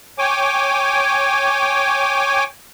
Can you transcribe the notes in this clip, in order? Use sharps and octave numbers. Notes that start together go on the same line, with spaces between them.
C#5 G5 G#5 D6